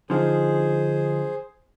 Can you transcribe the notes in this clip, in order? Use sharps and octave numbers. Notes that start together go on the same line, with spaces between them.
D3 F3 D#4 G#4 C5